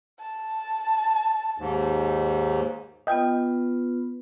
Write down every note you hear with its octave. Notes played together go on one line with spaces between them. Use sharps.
A5
D#2 G#2
B3 F4 B4 D#5 G5